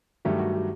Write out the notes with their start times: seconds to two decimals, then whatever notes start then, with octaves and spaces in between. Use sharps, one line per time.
0.25 G2 D#3 F#3 A3 G4
0.39 F#4
0.53 G4